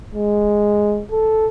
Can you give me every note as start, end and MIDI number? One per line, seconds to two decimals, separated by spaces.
0.15 1.03 56
1.12 1.48 69